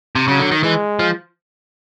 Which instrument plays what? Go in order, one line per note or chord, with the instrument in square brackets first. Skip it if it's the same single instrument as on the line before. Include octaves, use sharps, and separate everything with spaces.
[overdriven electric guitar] C3
[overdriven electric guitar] C#3 [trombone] F#3
[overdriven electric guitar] D3
D#3
[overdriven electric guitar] E3 [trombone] G#3
[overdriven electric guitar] F3